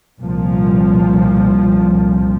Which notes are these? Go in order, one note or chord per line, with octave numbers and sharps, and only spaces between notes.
C2 A#2 F3